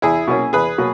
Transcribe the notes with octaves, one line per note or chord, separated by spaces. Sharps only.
E2 E4 G#4
B2 F#3 A#3 C#4
E2 G#4 B4
B2 F#3 A#3